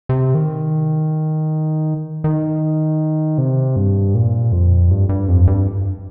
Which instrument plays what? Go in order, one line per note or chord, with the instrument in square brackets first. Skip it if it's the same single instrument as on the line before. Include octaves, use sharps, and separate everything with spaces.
[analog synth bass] C3
D#3
D#3
C3
G2
A#2
F2
G2
G2
F2
G2